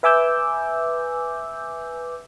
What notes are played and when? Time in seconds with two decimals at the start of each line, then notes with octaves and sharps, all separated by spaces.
0.03 B4 E5 G#5 D6 E6 G6